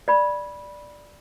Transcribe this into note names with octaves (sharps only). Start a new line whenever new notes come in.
D5 B5